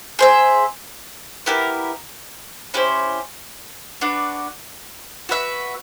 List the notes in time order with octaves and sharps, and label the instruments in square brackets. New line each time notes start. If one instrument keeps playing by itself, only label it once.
[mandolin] G#4 C5 E5
B3 E4 G4 A#4
C#4 E4 G4 C5
D4 F#4 B4 D5
F#4 B4 E5